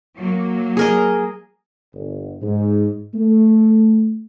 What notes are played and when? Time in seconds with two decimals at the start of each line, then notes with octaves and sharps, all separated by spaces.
0.18 F#3 A#3
0.77 G#4 A#4 D#5
1.95 G1
2.42 G#2
3.14 A3